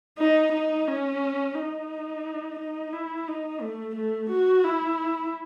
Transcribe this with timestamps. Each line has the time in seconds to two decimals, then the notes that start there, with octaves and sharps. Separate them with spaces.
0.18 D#4
0.52 D#4
0.87 C#4
1.55 D#4
2.59 D#4
2.93 E4
3.28 D#4
3.61 A3
3.96 A3
4.30 F#4
4.64 E4